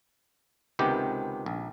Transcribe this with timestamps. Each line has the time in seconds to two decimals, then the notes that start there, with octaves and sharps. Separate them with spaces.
0.79 C#2 C3 D#3 B3 G4
1.46 A#1